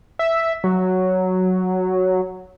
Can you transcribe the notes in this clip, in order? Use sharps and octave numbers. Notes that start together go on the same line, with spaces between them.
E5
F#3